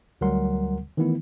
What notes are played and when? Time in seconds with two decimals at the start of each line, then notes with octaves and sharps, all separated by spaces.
0.21 D2 F#3 G3 A#4 F#5 C6
0.97 D#3 E3 A3 B3 E4